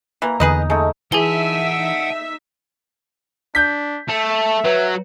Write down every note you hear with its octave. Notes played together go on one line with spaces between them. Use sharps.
E3 A#3 A#5
E2 D3 D#4 G#4 B4 D#5
C#3 G#3 A3 D#4
E3 D#4 G#4 E5 F#5 G#5 A5 G7
D4 G6 B6
A3 E5
F#3 B4 C#5 G5